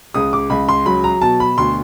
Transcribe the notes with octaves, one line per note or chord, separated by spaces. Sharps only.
C#2 D#6
D6
C#2 B5
C6
F#3 B5
A#5
B2 A5
B5
D2 C6